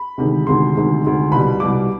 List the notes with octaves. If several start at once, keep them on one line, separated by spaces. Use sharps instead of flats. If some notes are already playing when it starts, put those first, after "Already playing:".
Already playing: B5
D2 C3 D#3 G#3
D2 C3 D#3 G#3 C6
D2 C3 D#3 G#3
D2 C3 D#3 G#3
C2 B2 G3 B5
C2 B2 G3 D6